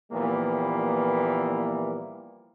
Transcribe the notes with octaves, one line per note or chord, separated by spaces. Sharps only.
A#2 E3 F3 G3 A#3 B3